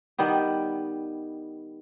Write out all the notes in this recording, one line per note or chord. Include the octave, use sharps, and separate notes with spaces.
D#3 G3 B3 G4